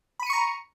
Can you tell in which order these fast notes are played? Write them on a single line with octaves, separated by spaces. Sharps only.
B5 D#7 C#7 C#6 A#5